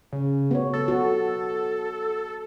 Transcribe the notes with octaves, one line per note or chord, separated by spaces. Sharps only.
C#3
B3 F#4 C#5
A4
F#4